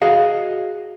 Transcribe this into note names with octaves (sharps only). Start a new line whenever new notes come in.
F#4 G#4 D#5 F5